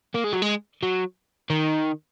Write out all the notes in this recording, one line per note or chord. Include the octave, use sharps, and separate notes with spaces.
A#3
G#3
F#3
G#3
F#3
D#3